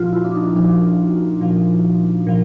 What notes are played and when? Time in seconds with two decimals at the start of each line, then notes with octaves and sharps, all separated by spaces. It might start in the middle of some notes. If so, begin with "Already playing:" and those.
Already playing: A#2 F3 F4 F#4
0.13 E4
0.25 D4
0.35 D#4
0.55 A#2 F3 D4
1.41 A#2 F3
2.27 A#2 F3